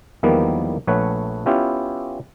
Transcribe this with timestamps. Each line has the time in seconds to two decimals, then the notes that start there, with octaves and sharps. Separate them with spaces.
0.23 E2 D#3 F3 G3 A#3 B3
0.87 A#1 A3 B4 C#5 F#5
1.46 B3 C#4 E4 F4 G4